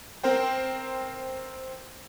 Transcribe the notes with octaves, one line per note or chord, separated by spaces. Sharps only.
C4 A#4 C5 G5